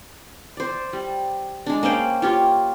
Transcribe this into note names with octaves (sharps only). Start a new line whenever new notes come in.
C5 D5
G3
G#3 D4
A#3 C#4 C5 G5
F4 G4 C#5